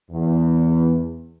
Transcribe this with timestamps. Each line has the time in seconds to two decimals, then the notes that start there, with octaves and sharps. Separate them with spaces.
0.11 E2